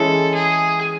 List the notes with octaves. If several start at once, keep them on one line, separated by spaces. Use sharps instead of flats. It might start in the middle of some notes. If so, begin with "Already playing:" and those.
Already playing: E3 G#3 C#4 E4 A4
G#4